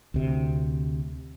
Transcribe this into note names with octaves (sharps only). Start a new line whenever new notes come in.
D2 C3